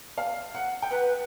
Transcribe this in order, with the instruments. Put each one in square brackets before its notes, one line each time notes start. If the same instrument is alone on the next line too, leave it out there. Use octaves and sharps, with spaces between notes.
[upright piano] F5
F#5
G5
[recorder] B4 [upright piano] F#5